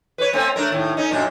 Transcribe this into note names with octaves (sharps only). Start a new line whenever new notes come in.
B4 C#5
A3 C4 C#4
A3 D4 A#4
D#2 A2
C#4 D#4
F#2 A#2 D4